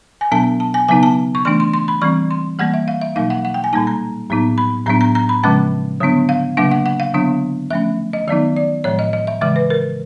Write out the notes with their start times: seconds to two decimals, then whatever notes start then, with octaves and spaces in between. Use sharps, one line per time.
0.21 G#5
0.32 B2 F#3 B3 D4 A5
0.60 A5
0.74 G#5
0.88 C#3 F#3 B3 D#4 G#5
1.03 A5
1.35 C#6
1.45 E3 A3 D4 C6
1.60 C6
1.74 C6
1.88 B5
2.02 E3 G3 C4 C#6
2.31 C6
2.59 E3 G3 A#3 F#5
2.74 E5
2.88 F5
3.02 E5
3.16 B2 F#3 A#3 D#4 F5
3.30 F#5
3.45 F#5
3.54 G5
3.64 G#5
3.73 A#2 G3 A#3 D#4 A5
3.87 A#5
4.30 A2 F#3 B3 D#4
4.58 B5
4.86 A2 F#3 B3 D4 A#5
5.01 A#5
5.15 A#5
5.29 B5
5.43 C#3 F3 G#3 C#4 A5
6.00 D3 F#3 B3 D4
6.29 F5
6.57 C#3 F#3 A#3 D4 F#5
6.71 F#5
6.86 F#5
7.00 F5
7.14 D3 F#3 B3 D4
7.71 F3 A3 C#4 E5
8.13 D#5
8.28 D#3 F#3 B3 D#4 D5
8.57 D5
8.84 A2 F3 G#3 C#5
8.99 D#5
9.13 D#5
9.27 E5
9.42 C#3 E3 G#3 E5
9.56 B4
9.70 A#4